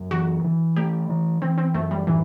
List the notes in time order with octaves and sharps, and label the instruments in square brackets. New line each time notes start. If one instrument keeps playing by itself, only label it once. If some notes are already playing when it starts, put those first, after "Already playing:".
Already playing: [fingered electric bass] F#2
[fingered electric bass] E3 [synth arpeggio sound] F#4
[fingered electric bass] E3
[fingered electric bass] A3 [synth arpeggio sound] G4
[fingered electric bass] E3
[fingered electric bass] E3 [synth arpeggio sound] C4
[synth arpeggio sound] C4
[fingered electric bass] F#2 [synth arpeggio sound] A3
[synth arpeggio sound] G3
[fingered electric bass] A2 [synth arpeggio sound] E3